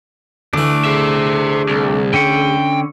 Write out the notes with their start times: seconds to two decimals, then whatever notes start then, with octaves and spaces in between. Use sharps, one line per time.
0.54 D2 E3 A3 D4
0.85 G#4 C5 E5
1.69 C2
2.14 D3 C#4 F#5 G5